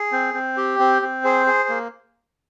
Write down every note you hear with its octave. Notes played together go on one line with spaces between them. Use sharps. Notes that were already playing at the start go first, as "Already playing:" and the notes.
Already playing: G#4
C4
C4
G4
C4
C4
G#4 C5
G#4
A#3